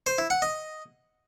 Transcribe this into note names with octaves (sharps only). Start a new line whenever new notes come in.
C5
E4
F#5
D#5